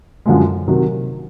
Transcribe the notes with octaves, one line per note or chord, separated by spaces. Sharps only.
F#2 D3 F3 G#3
C3 D#3 F#3